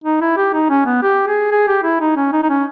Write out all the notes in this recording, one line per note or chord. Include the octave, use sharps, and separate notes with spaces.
D#4
E4
G4
D#4
C#4
B3
G4
G#4
G#4
G4
E4
D#4
C#4
D#4
D#4
C#4